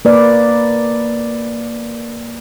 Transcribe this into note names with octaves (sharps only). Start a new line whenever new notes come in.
A#3 B4 D5